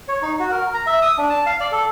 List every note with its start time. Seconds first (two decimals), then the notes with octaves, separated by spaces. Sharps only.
0.08 C#5
0.22 D#4
0.39 F#4
0.51 A#4
0.74 A#5
0.87 E5
1.02 D#6
1.17 D4
1.30 A5
1.46 F5
1.60 D5
1.72 A4